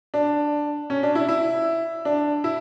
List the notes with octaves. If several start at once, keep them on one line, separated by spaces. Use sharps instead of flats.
D4
C#4
D4
E4
E4
D4
E4